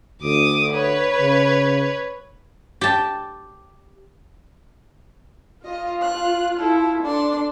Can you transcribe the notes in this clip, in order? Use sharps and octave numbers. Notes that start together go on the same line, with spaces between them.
D2 D6 D#6
B4 C#5
C#3
G4 A5
F4 D#5
F#6
E4 A4
D4 A4 C6